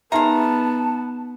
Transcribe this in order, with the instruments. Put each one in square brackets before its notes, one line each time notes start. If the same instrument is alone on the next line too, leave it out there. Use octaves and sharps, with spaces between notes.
[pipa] G#3 A#4 [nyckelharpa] B3 [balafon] D#4 E5 [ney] A5